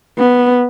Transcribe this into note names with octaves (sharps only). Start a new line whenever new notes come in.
B3